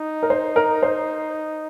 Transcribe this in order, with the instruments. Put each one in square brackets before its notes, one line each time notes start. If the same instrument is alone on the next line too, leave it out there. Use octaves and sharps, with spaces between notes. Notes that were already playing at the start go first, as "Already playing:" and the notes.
Already playing: [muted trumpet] D#4
[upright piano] A#4
C5
A#4
C5